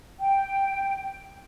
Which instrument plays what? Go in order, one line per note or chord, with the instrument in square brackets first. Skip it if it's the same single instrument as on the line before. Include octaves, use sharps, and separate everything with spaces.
[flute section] G5